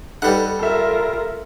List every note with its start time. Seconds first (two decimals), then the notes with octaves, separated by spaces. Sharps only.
0.22 G3 D#4 A4 B4 F#5
0.59 F4 A4 A#4 E5